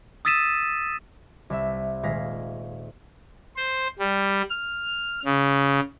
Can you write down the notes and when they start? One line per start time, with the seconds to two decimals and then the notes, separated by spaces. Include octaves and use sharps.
0.25 D#6 E6 A6 B6 D#7 E7
1.50 C2 E5
2.03 D#1 G#3 F5 A#6 B6
3.56 C5
3.99 G3
4.50 F6
5.25 C#3